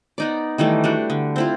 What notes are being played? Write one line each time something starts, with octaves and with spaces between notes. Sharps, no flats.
B3 D#4 D5
D#3 E3 G3 A3
G3 D4 F#4
D3
C4 E4 F4